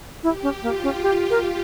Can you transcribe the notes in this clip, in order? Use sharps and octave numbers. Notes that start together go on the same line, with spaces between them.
E4 G4
C#4
A#3 F4
C#4
G4
A#4